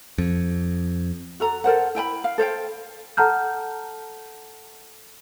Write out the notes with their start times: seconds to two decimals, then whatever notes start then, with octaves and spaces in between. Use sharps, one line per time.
0.18 F2
1.40 F#4 A4 A#5
1.64 A4 A#4 C5 F#5
1.95 E4 G5 G#5 B5
2.24 F5
2.38 A4 C5 F5 G5
3.17 A4 F#5 A5 A#5 F6 G6